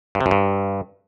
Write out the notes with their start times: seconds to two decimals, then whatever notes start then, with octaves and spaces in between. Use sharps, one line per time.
0.15 G2
0.20 C3
0.26 F#2
0.31 G2